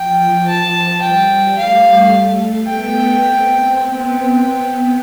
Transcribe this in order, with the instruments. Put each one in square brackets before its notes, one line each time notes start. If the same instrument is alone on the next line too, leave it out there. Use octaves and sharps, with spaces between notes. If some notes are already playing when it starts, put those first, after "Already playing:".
Already playing: [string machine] F3 [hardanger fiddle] G5
[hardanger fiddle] A5
[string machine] G3 [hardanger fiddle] G5
[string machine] A3 [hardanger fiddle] F5
[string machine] B3 [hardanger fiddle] G5
[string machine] C4
[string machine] B3 [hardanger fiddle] G5
[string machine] B3